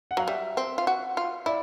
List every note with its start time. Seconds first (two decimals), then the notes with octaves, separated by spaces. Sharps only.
0.11 F#5
0.17 F#3 F5
0.28 G3 E5
0.57 C4
0.78 F4
0.87 F#4
1.17 F4
1.46 E4 D5